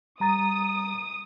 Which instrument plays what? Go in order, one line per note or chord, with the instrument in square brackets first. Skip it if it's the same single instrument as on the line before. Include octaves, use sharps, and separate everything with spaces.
[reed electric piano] G3 A#5 A6 [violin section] D#6